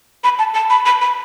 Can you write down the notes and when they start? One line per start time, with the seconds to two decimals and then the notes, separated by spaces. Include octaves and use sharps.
0.24 B5
0.39 A5
0.54 A5
0.70 B5
0.86 B5
1.01 B5